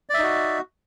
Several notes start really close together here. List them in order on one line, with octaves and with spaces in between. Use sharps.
D5 E5 D#4 F#4